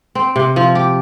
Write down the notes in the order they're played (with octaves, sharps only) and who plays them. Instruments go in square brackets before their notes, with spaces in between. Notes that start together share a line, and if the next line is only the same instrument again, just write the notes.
[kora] C4
C3
F3
G4